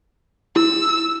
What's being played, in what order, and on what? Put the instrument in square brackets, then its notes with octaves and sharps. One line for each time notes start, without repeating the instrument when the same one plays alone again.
[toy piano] E4 [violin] E6